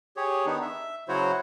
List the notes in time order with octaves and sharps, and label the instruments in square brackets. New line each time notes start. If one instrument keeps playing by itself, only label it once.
[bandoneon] G4 G#4 C#5
D#3 B3 D4 D#4
E5
C#3 F#3 E4 F#4 C5 C#5